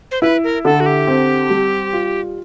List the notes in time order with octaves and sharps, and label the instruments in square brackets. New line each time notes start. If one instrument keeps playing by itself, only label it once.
[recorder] C5
[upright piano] E4 [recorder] B4
[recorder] A#4
[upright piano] D3 [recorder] A4
[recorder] F#4
G4
[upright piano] C4
G3
F4